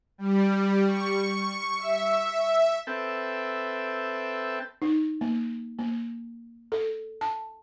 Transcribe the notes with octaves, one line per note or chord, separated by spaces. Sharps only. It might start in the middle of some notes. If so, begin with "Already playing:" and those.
G3
C#6
E5
C4 A4 B4 E5 G5
D#4
A#3
A#3
A4
A5